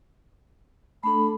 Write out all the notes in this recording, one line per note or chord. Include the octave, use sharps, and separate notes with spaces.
A3 D4 A4 B5